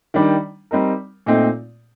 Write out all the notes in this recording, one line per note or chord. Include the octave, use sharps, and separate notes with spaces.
D#3 G3 D4
G3 C4 D#4 A#4
A#2 A3 C4 D#4